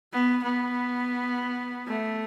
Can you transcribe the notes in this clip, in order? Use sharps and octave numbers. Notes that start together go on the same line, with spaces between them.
B3
B3
A3